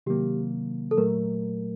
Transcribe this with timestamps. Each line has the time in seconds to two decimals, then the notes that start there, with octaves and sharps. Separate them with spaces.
0.06 C3 D#3 F#3 A#3 G4
0.91 A4
0.97 A#2 F#3 A3 A#4